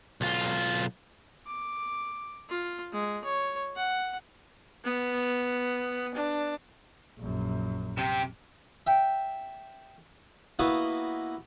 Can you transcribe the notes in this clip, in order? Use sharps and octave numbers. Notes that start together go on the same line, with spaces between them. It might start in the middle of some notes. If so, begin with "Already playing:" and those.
B1 F4
D6
F4
G#3
C#5
F#5
B3
D4
A#1 F#2
C3 G4
E5 G5
A#3 B3 E4 F#4 D#5